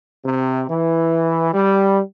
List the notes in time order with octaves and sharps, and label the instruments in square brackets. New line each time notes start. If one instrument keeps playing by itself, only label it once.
[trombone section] C3
E3
G3